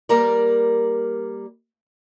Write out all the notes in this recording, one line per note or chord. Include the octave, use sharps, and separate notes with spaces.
G3 A#3 A#4 D5